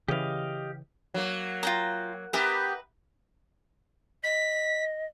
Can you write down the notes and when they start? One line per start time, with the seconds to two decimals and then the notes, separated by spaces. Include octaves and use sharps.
0.08 C#3 E3 G4 D#5 F5
1.14 F#3 A#3
1.63 F4 G5 A#5
2.33 B3 G4 A#4 B4 E5 A#5
4.24 D#5 B6